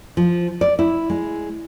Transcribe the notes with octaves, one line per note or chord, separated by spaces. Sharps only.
F3
D5
E4
G#3